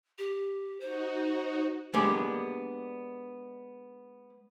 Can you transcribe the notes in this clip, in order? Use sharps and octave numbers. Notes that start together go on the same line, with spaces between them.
G4
D#4 F#4 C5
G#3 A#3 B3 D4 G4